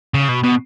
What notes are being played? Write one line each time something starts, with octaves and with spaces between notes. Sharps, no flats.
C#3
B2
B2